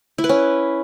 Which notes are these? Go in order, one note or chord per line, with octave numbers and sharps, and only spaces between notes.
E4
B4
C#4